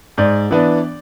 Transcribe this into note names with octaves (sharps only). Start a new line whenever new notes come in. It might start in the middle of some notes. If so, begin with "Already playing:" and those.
G#2 D5
E3 B3 D4